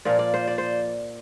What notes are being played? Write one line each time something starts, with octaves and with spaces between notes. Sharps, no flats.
A#2 F3 A#3 D5
D5
C5
D5
C5